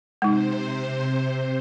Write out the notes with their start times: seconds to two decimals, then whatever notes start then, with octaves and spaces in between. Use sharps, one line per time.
0.22 C3 G#3 D#4 C5